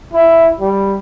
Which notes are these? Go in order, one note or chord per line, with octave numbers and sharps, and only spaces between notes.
E4
G3